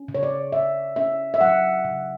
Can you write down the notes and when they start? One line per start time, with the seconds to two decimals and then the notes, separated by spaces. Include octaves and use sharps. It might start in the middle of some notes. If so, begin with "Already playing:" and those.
Already playing: C#4
0.08 C#3
0.15 C#5
0.23 D5
0.52 C#3 E5
0.96 C#4 E5
1.34 E5
1.41 F#3 F#5
1.85 C#3